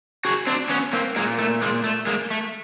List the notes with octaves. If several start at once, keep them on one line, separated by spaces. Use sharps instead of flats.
F#4 G#4
C4 D4
B3 C#4
A#3 C4
A#2 G#3 A#3
A3
G#3 A#3
A3
G#3 A#3
A3